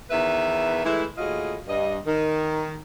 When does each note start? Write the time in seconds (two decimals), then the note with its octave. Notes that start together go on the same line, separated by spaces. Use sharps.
0.11 E2 D#3 B4 E5
0.84 E3 G#3 A3 E4
1.18 D#2 A2 F4 F#4 G#4 D#5
1.67 G2 D#5
2.06 D#3